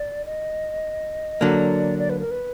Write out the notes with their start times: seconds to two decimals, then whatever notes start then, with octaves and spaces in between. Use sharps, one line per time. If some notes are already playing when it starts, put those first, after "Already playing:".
Already playing: D5
0.26 D#5
1.41 D3 F#3 A#3 D5
1.99 D5
2.10 B4
2.20 A#4
2.31 B4